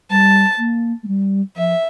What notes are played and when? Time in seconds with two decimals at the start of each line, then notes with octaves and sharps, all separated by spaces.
0.10 G3 A5
0.58 A#3
1.03 A3
1.08 G3
1.56 F3 E5